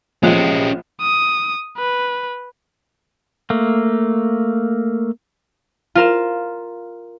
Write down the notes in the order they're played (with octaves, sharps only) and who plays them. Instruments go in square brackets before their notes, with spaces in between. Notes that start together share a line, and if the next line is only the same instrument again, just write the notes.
[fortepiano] A#1 F3 F#6 [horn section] C3 G#3 [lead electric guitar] C#4 G4
[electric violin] D#6
B4
[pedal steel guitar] A3 A#3
[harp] F4 A#4 E7